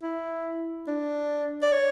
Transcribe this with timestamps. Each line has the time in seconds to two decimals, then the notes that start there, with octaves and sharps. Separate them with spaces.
0.03 E4
0.88 D4
1.63 D5
1.72 C#5